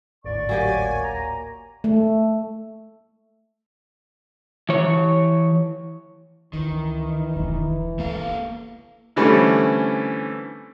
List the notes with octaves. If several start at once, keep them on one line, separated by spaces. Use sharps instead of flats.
G#1 D2 A2 D5 C#6
F#3 A#3 G4 G#5
A#5
A3
E3 C#5
C#2 D#3 E3
E1 D#4
A#3 B3 A4 F5
D3 E3 G3 A3 C4 C#4